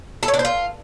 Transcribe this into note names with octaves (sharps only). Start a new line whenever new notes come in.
A4
C#5
D4
C5
F4